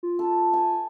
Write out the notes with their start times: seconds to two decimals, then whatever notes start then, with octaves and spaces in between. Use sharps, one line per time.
0.03 F4
0.19 A4
0.53 G#5